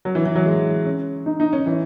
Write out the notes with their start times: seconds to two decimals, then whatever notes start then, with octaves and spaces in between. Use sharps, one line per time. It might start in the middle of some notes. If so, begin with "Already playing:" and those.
0.05 F#3
0.15 E3
0.26 E3
0.36 F#3
0.46 G#3
0.85 C#4
1.26 D#4
1.40 D#4
1.53 C#4
1.66 E3